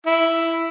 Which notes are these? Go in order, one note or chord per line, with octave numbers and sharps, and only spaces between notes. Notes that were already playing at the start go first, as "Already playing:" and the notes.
E4